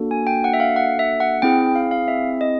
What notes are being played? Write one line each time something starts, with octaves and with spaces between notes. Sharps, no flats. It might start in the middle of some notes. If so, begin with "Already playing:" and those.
Already playing: A#3 D4 F#4 A4
G#5
G5
F#5
E5
F5
F#5
E5
F#5
C4 E4 G#4 G5
F5
F5
E5
D#5